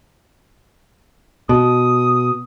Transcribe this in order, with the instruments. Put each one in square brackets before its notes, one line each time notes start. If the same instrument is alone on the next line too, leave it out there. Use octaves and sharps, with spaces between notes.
[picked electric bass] B2 [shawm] D#6